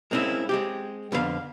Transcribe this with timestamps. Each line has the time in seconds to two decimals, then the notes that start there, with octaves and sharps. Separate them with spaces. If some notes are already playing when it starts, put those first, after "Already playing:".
0.11 G#3 A#3 C4 C#4 E4
0.49 G#3 C4 G4
1.12 F2 D3 B3 A4 F5